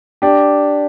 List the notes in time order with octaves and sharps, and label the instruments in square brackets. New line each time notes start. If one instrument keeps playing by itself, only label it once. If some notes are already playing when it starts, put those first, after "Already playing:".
[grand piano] D4 G4